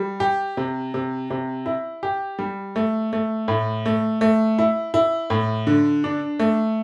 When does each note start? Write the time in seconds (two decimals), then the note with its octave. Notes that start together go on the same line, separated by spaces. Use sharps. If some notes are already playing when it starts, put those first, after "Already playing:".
Already playing: G3
0.20 G4
0.57 C3
0.94 C3
1.30 C3
1.66 E4
2.03 G4
2.39 G3
2.76 A3
3.13 A3
3.48 A2
3.86 A3
4.21 A3
4.58 E4
4.94 E4
5.30 A2
5.67 D3
6.04 D4
6.39 A3